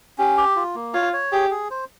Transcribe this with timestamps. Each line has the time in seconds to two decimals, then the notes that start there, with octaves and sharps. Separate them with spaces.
0.18 C#4 G4
0.37 G4
0.56 F4
0.75 A#3
0.94 F4 C#5
1.13 C#5
1.32 G4 G#4
1.50 G#4
1.70 C5